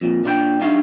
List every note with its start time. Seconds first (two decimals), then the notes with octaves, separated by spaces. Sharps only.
0.01 F2 A#2
0.24 A#2 D4 F4 A#4 G5
0.61 G3 D4 D#4 E5 F5